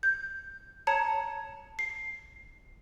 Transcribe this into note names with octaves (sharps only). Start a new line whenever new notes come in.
G6
C#5 A5 A#5 G#6 C#7
C7